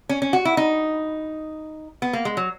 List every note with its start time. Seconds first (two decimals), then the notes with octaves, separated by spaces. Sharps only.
0.09 C#4
0.22 C#4
0.33 F#4
0.45 E4
0.57 D#4
2.02 B3
2.13 A#3
2.25 G#3
2.37 F#3